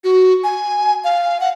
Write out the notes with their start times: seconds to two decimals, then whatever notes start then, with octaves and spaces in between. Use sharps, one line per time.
0.04 F#4
0.44 G#5
1.04 F5
1.41 F#5